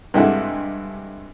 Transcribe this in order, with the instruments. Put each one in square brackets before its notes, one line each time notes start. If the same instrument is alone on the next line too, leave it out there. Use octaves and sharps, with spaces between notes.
[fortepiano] G2 C3 G#3 E4 A4 F#5